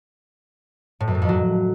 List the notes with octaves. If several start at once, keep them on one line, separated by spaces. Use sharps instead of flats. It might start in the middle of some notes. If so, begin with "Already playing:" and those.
A2
F#2
A2
F2
F#3